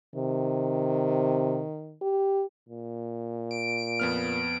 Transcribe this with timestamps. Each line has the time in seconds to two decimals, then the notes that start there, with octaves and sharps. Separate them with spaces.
0.15 C3 D#3
2.02 G4
2.69 A#2
3.51 D7
4.00 F2 B3 F6